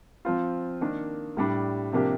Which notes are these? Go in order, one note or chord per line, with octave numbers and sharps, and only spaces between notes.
F3 C4 F4
D#3 A#3 D4
A2 G3 D4
C3 F3 A#3 D4 G4